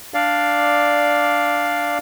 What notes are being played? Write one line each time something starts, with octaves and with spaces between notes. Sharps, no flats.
D4 D5 F5